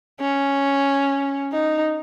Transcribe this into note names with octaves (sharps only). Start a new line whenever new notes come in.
C#4
D#4